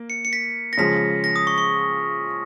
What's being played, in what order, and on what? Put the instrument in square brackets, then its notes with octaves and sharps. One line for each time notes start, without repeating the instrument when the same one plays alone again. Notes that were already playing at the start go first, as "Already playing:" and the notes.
Already playing: [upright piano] A#3
[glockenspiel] C#7
C#7
B6
A#6
[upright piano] C#3 F3 G#3 [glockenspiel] B6
[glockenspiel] A#6
D#6
C#6
C#6